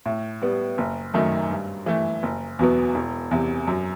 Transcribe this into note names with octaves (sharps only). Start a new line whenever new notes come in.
A2
G3 B3
F#1
F#2 D#3 A3 D#4
G2
E3 A3
F#1
E2 B2 F#3 B3
E1
E2 C3
F#2